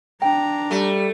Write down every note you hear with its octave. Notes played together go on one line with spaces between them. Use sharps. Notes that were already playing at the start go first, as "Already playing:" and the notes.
D4 G5 A#5
G3 A3